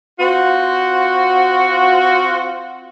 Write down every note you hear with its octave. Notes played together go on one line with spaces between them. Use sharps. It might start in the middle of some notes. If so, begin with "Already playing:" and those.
C4 F4 F#4